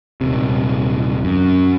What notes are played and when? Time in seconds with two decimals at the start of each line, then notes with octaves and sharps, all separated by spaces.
0.21 D#1 C3
1.24 F#2